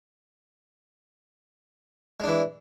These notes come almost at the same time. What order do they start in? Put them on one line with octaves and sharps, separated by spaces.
G#3 D4 E3